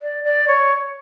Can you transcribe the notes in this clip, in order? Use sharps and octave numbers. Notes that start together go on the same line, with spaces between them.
D5
D5
C#5